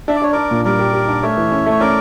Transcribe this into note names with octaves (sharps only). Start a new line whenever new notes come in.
D4 E5
D5
D4 C#5
D4 A#4 D5
A#2
G3 A#4 D5
G4
G4
D4
A3 C#5 E5
E3
C#4
A3
C#5
C#4 A#4 D5